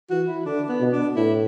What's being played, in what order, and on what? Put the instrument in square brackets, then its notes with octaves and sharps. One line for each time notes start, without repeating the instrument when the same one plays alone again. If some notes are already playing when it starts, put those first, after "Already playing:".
[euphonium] E3 [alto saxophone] F#4
[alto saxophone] E4
[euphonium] D3 [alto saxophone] D4
[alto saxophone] B3
[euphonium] B2
[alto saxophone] D4
[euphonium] A2 [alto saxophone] E4